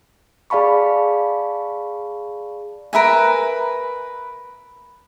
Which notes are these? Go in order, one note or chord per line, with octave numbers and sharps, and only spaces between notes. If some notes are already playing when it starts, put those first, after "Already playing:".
G#4 D5 F5 A5 B5 C#6
A#4 B4 E5 G#5